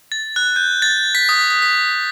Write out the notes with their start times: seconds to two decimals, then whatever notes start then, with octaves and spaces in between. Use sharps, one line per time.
0.12 A6
0.36 F#6
0.56 G6
0.82 A6
1.15 B6
1.29 D#6
1.50 B6
1.62 B6